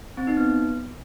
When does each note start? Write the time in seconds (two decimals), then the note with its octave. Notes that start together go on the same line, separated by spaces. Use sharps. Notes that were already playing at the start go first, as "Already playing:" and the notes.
0.17 C4
0.27 D#4
0.37 B3